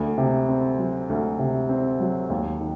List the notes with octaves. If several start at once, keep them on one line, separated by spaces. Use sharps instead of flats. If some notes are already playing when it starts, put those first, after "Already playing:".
Already playing: D2
C3
C4
F#3
D2
C3
C4
F#3
D#2
D#3